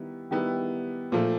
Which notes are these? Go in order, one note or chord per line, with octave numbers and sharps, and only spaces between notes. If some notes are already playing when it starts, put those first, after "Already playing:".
Already playing: D#3 G3 B3 E4
D#3 G3 B3 E4
A#2 F3 A3